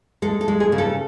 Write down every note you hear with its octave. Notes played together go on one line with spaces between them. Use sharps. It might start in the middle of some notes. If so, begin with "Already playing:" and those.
G#3 A4
A4
G#3
G#4
C#3
A4